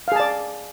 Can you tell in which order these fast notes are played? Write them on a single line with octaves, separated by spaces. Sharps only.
F5 G#4 A5 D5